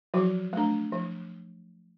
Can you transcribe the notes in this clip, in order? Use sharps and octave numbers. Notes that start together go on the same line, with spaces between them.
F3 F#3 F#4
A3 D4
F3